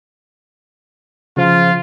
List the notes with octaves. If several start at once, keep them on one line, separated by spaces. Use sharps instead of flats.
C#3 F3 F4